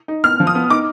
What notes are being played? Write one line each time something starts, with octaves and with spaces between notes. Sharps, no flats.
D#4
B3 F6
F3
D#6
B3
D#4 D6